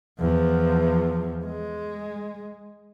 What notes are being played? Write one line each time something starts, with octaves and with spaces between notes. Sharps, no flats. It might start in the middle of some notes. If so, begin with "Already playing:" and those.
E2 F3
G#3